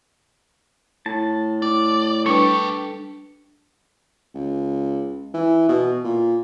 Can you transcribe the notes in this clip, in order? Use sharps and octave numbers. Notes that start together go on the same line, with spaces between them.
A2 A5
A2 D5
G3 A3 D4 G4 A4 B4 C#6
C#2
E3
B2
A#2